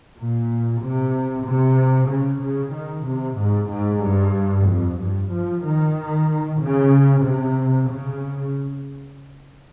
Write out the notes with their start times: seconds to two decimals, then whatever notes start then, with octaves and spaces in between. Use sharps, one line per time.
0.16 A#2
0.81 C3
1.45 C3
2.10 C#3
2.41 C#3
2.73 D#3
3.06 C3
3.38 G#2
3.70 G#2
4.02 G2
4.67 F2
4.99 G2
5.31 F3
5.63 D#3
6.60 C#3
7.24 C3
7.89 C#3